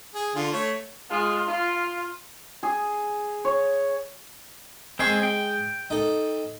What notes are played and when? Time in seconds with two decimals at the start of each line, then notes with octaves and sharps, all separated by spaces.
0.15 G#4
0.35 D3 F4
0.53 A3 C#5
1.10 G#3 F4
1.47 F4
2.63 G#4
3.45 C#5
4.99 G#3 C4 G#4 B5 C#6
5.23 G5
5.90 D#4 A4